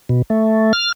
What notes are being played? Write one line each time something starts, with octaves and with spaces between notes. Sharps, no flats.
B2
A3
F6